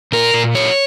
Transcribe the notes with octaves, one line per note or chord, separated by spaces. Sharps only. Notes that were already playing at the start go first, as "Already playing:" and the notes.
A#2 A#4
A#2
F#3 C#5